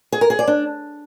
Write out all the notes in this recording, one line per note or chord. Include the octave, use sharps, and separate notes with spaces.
G#4
A#4
G#4
D5
D4